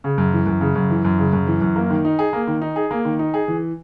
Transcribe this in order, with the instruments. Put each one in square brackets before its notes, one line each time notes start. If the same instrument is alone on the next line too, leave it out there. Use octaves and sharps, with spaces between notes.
[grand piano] C#3
F#2
E3
F#2
C#3
F#2
E3
F#2
C#3
F#2
E3
F#2
A#3
D#3
D#4
G#4
A#3
D#3
D#4
G#4
A#3
D#3
D#4
G#4
E3